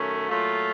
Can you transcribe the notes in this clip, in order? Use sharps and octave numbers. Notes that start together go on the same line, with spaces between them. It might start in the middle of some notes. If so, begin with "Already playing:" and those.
Already playing: F#2 D#3 A3 C#4
A#2 F#3 A3 F4